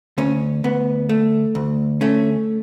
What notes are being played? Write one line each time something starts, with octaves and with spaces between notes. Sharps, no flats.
D2 C#4
D2 B3
A3
D2
A3 C#4